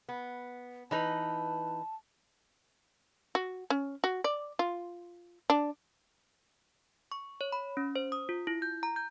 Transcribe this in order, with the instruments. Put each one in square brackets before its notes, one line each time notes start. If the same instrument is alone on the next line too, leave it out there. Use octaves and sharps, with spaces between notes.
[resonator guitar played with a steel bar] B3
[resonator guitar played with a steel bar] E3 D#4 B4 [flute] A5
[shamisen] F#4
C#4
F#4
D5
F4
D4
[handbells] C#6
C#5
B5
C#4
C5
D#6
F4
E4
G6
A#5
G6